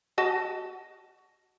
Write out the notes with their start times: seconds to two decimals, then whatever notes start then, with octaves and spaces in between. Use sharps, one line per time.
0.18 F#4 D#5 A5